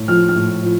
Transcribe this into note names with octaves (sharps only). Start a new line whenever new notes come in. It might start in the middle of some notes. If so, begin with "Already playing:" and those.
Already playing: A2
F3 F6
F6
A2
F3